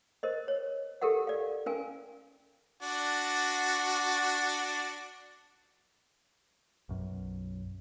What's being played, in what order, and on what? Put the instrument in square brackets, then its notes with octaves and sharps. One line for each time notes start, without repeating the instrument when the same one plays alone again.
[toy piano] A#4 C5 D#5
C#5
G4 A4 A#4 E5 F#5
D5 F5
C#4 A#4 F5 G#5
[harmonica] D4 F#4 D5
[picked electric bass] B1 F#2